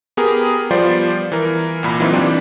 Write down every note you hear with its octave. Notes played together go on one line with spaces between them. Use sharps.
B3 G4 G#4 A#4
F3 G3 B3 F4 C5 D5
E3 A#4
C2 A#2 B5
E3 F#3 A#3 C4 D#4 F4
E3 G3 C4 D4 G4